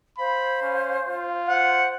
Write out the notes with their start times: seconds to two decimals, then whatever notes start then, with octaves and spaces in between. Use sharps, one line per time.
0.18 C5 F5 B5
0.62 C#4
1.09 F4
1.49 C5 F#5